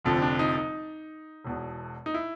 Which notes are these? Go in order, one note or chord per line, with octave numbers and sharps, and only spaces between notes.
F1 F2 D3 F3
D4
D#4
D#4
E1 E2 B2
D#4
E4